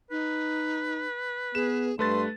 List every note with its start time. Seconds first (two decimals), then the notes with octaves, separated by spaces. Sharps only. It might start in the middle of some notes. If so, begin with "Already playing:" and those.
0.11 D#4 B4
1.55 B3 G#4 E7
1.99 G2 A3 B4 C6 A6